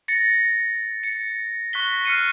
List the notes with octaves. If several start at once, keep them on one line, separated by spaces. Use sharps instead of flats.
A6 A#6 C#7
C#7
C#6 F#6 A#6 B6 G7
F6 F#6 C7 C#7 D#7